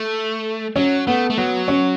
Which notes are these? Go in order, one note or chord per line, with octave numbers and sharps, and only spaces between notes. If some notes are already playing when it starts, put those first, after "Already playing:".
Already playing: A3
F#3 C#4
A3 B3
A3
F#3 B3
C#4